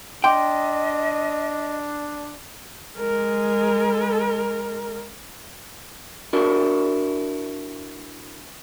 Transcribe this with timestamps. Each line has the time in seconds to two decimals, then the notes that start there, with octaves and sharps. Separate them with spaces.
0.24 D4 D#5 G5 C6 D6
2.97 G#3 A#4
6.33 D4 E4 F#4 A#4 D5